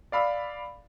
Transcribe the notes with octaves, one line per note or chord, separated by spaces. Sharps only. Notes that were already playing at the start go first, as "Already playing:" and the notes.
D5 F5 B5 E6